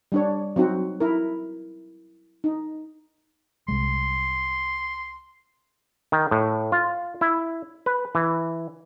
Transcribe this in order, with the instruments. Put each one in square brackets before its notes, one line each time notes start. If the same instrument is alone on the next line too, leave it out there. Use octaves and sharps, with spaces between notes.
[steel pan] G3 D4 C#5
F#3 C4 D#4 F#4
E4 A#4
D#4
[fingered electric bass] C2 G#3 [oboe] C6
[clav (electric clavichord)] D#3
A2
F4
E4
B4
E3